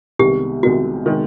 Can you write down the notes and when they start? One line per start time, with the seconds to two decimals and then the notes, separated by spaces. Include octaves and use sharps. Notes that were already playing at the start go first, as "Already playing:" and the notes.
0.19 C2 C3 D#3 G#3 B3 G4
0.63 C2 C3 D#3 G#3 B3 F#4
1.06 C3 D#3 G#3 B3